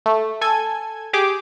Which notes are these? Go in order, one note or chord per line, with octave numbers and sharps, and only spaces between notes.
A3
A4 G#5 G#6
G4 G#4 D6